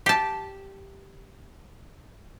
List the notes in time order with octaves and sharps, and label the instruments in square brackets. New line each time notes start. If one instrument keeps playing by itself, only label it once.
[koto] G4 A5